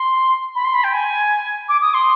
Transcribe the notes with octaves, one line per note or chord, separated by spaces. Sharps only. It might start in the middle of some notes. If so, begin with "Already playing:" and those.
Already playing: C6
B5
C6
B5
G5
G#5
D6
D#6
C6